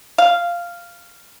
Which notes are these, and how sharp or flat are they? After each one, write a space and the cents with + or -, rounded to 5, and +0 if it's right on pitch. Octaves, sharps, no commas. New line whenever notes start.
F5 -5